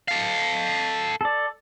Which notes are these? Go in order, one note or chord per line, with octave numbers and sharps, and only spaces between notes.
A4 F5
A4 D5